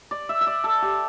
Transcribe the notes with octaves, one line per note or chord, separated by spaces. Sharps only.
D5
E5
E5
D5
A4
G4